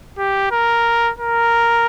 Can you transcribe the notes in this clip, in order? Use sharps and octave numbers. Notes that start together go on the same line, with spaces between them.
G4
A#4
A#4